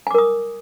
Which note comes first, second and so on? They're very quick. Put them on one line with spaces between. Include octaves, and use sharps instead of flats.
G#5 D6 A#4 D#6